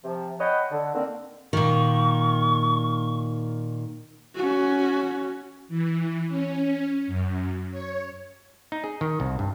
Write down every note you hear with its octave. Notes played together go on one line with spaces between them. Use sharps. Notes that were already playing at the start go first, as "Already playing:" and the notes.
C3 F3
C#5 D#5 F#5 G5 B5
D3
D3 D#3 A#3 C4
A#2 D#3 C#6
C#4 F#4
E3
C#4
F#2
C#5
D#4
G#4
D#3
C2
G2